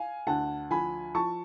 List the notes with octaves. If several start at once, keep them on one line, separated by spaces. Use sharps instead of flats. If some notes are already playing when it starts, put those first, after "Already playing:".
Already playing: F5 G#5
D2 F#5 A5
F3 G#5 B5
F3 A5 C#6